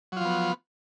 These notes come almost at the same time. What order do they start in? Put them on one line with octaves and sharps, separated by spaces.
F#3 F4 F3 B3